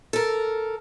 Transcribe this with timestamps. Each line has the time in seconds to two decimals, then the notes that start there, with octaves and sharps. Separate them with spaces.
0.13 A4 A#4